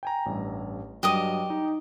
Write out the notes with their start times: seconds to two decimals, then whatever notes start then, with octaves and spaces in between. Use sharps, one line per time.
0.03 G5 G#5 A#5
0.26 A1 G2
1.03 G2 F#3 G4 D#5 D#6
1.50 D#4